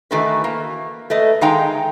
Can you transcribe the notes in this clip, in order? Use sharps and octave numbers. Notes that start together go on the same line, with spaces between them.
D#3 E3 A3 D#4 F#4 B4
A#3
A3 B4 D#5
D#3 G#3 D#4 F5 G5 A#5